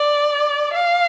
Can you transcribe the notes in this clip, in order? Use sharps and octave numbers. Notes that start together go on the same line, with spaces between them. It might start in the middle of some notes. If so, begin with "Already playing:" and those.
Already playing: D5
F5